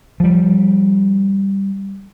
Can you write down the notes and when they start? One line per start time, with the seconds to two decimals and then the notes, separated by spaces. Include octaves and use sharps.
0.20 F3 G3